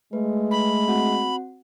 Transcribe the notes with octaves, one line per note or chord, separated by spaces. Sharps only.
G#3 A3 B4
B5
C4 F#4 F#5